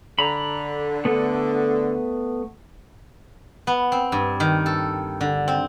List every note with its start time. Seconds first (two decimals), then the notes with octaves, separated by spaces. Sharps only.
0.19 D3 A#5 B5
1.05 A3 B3
3.67 B3
3.92 C4
4.12 G2
4.40 D#3
4.66 A4
5.21 D3
5.48 C4